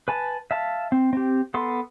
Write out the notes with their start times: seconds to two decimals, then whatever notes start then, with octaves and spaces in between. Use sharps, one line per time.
0.08 B4 G#5 A5
0.51 E5 F5 A5
0.92 C4
1.13 C4 G4
1.54 B3 A4 C6